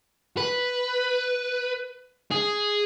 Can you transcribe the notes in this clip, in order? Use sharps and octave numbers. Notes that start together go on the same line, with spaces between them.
B4
G#4